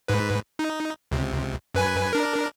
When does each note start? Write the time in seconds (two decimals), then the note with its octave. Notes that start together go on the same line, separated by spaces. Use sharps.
0.08 G#2 B4
0.59 D#4
1.11 C#2 C3
1.74 F#2 B4 G#5
2.13 D4 A#4